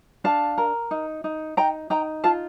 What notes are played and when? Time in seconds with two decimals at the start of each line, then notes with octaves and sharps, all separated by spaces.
0.24 D4 F5 A5
0.58 A#4
0.91 D#4
1.24 D#4
1.57 D#4 G5 A#5
1.90 D#4 G5 A#5
2.24 F4 F5 A5